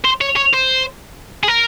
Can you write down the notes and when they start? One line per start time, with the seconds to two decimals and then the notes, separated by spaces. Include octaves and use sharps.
0.05 C5
0.21 C#5
0.36 C#5
0.53 C5
1.43 G#4
1.48 A#4